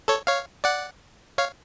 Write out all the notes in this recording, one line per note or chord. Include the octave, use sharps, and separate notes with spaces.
A4 C#5
C#5 F5
D5 F#5
C#5 F5